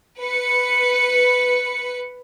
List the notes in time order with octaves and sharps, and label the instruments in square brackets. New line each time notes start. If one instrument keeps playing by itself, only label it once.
[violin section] B4 C#7